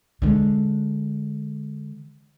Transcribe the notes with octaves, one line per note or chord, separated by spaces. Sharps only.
D3 G#3